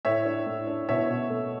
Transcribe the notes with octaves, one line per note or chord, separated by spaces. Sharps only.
A2 C#5 E5
D4
A2
D4
B2 C#5 E5
B2
A3